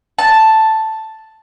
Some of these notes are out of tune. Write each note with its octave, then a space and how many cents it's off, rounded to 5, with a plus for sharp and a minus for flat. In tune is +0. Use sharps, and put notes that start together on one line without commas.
A5 +0